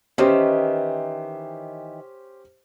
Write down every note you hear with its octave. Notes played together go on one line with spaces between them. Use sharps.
D#3 E3 C#4 G4 C5